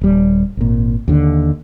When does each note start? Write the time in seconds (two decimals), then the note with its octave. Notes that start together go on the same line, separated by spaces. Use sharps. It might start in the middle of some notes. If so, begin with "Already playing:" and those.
0.01 D#1 G3
0.57 G#1 A#2
1.08 D#2 D3